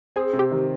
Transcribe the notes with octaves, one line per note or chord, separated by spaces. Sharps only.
C4 G#4
C3
G4
D#3